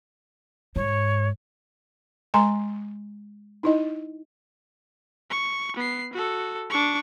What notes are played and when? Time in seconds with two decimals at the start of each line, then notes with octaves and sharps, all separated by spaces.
0.76 G#2 C#5
2.34 G#3 G#5 A#5 C6
3.63 D#4 E4 D#5
5.30 C#6
5.77 B3 C7
6.13 F#4 A4
6.70 D4 C#6